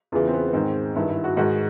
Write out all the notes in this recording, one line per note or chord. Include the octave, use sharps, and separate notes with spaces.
E2 C#3 E3 F4
C4
B3
B3
G#2 D#3 C4
G2 D#3 E4
E4
F#4
G#2 D#3 F#4